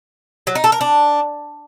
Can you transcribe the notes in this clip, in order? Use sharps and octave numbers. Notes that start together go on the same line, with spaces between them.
F#3
D#4
A4
A#4
D4